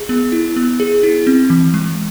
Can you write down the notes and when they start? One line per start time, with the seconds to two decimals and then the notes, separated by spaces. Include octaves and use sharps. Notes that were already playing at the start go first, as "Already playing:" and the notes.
Already playing: G#4
0.09 B3
0.32 E4
0.56 B3
0.80 G#4
1.03 E4
1.27 C4
1.50 E3
1.74 G#3